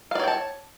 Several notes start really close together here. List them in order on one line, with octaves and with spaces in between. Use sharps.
F5 D5 C#5 G5 A5